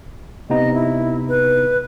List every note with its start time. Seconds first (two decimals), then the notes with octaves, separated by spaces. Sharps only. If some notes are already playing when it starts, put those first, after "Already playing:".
0.50 C3 B3 D#4 D#5
0.74 E4
1.28 B4